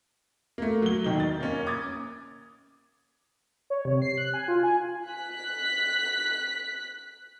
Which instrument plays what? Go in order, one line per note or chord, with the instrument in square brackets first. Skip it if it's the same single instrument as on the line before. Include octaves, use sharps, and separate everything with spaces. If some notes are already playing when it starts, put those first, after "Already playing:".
[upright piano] A3 A#3
F#3 G7
E1 D#3 D#4 G7
A6
A#3 C#4
D6 D#6 G#6 A6
[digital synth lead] C#5
C3
C7
F#6
G#5
F4
G#5
[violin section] F#6 B6